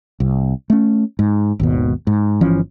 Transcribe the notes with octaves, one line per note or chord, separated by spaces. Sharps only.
C2
A3 C#4
G#2
G#1 D#2 B2
G#2
G1 E3 F3 C#4